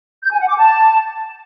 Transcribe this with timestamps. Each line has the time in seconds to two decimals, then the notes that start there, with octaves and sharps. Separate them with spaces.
0.23 G6
0.31 G#5
0.40 F#5
0.48 D6
0.57 A5